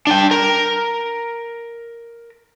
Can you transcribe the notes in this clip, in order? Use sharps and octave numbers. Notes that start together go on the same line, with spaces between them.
D4 G5
A#4